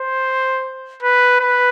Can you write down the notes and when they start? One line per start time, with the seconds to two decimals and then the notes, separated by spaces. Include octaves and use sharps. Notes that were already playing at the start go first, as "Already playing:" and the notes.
Already playing: C5
1.03 B4
1.41 B4